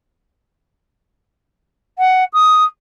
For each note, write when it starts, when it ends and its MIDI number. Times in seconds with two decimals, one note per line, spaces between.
1.99 2.24 78
2.34 2.64 87